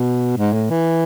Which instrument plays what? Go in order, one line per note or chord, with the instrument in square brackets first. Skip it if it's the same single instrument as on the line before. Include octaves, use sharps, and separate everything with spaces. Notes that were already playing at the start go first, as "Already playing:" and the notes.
Already playing: [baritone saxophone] B2
G#2
A2
E3